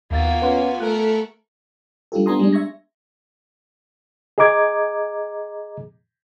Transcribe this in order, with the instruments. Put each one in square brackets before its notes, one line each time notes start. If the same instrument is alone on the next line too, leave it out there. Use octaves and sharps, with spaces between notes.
[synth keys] D#2 E5 A6 [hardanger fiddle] A#3 F#4 [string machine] B3 F4 G#5
[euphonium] C#4 [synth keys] B4 F#5 C6
[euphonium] A3 [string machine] A4 B5 C#6 [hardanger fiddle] A#4 [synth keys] F#6
[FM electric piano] G3 D4 F4 G4 A4
B3 D4 G#5 A#5 C6 D#6
G3 G#3 D4
E5 C#6 G#6 A#6
[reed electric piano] G#4 D#5 A#5 D6 G#6